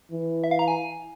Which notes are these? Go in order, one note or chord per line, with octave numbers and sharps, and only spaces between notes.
E3
E5
F5
A#5
G#5